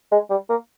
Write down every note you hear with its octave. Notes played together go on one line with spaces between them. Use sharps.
G#3
G3
A#3